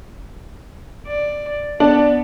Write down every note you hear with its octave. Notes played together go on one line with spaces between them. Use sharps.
D5
B3 D4